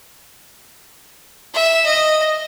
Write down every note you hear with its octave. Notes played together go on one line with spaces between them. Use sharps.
E5
D#5